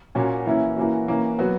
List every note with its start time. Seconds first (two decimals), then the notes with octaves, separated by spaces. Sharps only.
0.15 A#2 A#3 C#4 F#4
0.46 E3 A#3 C#4 E4
0.76 E3 A#3 C#4 F#4
1.08 E3 A#3 C#4
1.39 F#3 B3 F#4